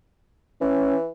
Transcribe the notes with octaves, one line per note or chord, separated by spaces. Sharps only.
E3 C#4